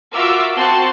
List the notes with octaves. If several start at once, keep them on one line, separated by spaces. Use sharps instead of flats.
F4 F#4 A#4 E5 D6 E6
C4 F#4 A5 C6